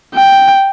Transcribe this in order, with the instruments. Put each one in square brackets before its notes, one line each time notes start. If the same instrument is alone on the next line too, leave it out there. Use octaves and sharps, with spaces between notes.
[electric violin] G5